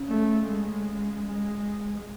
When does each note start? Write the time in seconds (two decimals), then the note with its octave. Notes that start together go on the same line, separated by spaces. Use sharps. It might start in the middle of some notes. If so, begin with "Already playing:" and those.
Already playing: C#3
0.08 A3
0.47 G#3
1.26 G#3